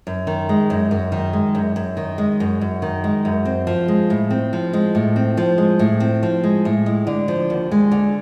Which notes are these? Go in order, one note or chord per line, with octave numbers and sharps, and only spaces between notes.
F#2
D#3
G#3
F#2
F#2
D#3
G#3
F#2
F#2
D#3
G#3
F#2
F#2
D#3
G#3
F#2
C4
F3
G#3
A2
C4
F3
G#3
A2
C4
F3
G#3
A2
C4
F3
G#3
A2
G#3
D3
F3
D#2
G#3
D3